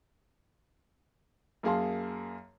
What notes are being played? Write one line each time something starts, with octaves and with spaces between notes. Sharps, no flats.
F#2 A#3 G#4 F5 A5 C6